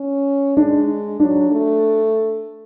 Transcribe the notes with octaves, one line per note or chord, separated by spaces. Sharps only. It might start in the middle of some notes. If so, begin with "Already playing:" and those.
Already playing: C#4
G#3 D4
F#3 D4
A3